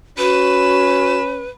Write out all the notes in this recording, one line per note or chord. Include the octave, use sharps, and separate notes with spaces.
C#4 F#4 B4 B5 E7